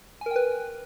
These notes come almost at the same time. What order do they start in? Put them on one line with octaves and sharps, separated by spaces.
G#5 A#4 G5 B4